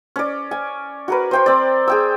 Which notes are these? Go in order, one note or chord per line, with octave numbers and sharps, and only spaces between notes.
C#4 D5
G#5
F#4 A#4 B4
C5 G5 C6
C4 D5
G#4 G5 E6